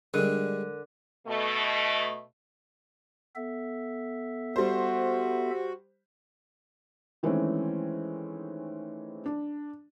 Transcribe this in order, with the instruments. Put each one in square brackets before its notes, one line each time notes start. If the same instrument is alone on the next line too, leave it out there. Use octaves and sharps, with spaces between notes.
[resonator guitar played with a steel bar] D3 [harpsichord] G3 G#3 [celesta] A#4 F#6 D#7
[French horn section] B2 A3
[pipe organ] B3 A4 E5
[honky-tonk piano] G3 C5 [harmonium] F#4
[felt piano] D#3 E3 G#3 A3 C4 C#4
D4